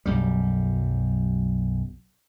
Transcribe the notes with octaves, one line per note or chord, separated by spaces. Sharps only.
B1 F#2 G3